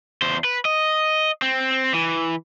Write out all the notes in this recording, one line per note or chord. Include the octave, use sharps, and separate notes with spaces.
E2 C5
B4
D#5
C4
E3